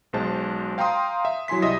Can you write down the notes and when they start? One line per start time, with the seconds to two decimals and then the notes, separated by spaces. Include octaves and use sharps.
0.13 B1 G#3 C5 A5
0.78 F5 G5 A#5 C6 D#6
1.25 E5
1.48 F#3 E4 G#5 C6 B6
1.62 C2 G3 D#5 E5 D#6 A#6